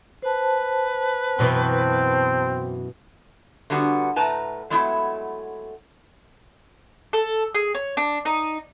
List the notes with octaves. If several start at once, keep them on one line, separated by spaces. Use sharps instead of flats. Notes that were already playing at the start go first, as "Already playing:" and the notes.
B4 C5 A5
F#2 B2 E3 C4
D3 G3 B3 F#4
A2 B4 A5 A#5
F#3 G#3 A3 B3 E4
A4
G#4
C#5
D4
D#4